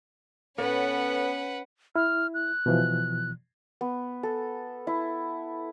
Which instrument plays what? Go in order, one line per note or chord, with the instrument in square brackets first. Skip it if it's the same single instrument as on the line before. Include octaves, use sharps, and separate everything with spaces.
[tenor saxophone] B3 [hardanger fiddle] C#4 [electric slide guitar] A4 C#5 [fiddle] B4 F#5
[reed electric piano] E4 [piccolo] F6
[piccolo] F#6
[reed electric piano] B2 E3 F3
[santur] B3
A4
E4